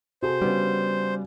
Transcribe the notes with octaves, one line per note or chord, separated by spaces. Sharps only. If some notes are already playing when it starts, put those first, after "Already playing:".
C3 F#4 G#4 A4 C5
C#3 G3 B3 D4